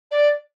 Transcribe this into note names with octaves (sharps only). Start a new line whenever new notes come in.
D5